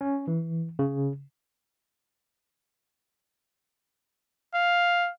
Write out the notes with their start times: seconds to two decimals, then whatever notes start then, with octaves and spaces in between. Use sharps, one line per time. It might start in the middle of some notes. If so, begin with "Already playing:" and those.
0.01 C#4
0.27 E3
0.79 C#3
4.56 F5